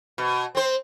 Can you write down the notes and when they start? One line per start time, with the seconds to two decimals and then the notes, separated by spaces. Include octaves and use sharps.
0.18 B2
0.55 C4 C5